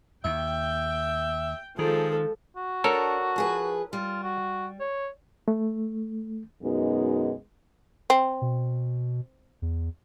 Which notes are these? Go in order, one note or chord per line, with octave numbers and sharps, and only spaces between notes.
D#2 E5 G5
D#3 F3 G#3 G#4 A4
F#4
D4 A4 A#4 C#5
F3 G#4 B4
G3 F4
F#4
C#5
A3
F#2 B2 G#3 B3 D#4
C4
B2
E2